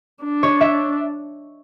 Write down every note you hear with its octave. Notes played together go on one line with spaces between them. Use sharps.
D4
C#5
E5